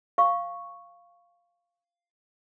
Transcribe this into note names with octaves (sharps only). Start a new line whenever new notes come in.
F5 C#6